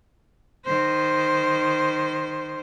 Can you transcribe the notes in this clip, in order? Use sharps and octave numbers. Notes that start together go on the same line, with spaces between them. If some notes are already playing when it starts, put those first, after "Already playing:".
D#3 C5